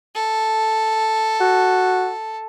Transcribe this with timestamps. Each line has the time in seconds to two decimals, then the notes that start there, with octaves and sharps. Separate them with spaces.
0.15 A4
1.40 F#4